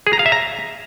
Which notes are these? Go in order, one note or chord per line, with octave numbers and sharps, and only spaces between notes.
G#4
A#5
F5
E5
A#5